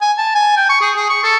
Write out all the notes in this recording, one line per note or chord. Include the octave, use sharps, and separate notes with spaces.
G#5
A5
G#5
G5
C#6
G#4
G#4
C#6
A4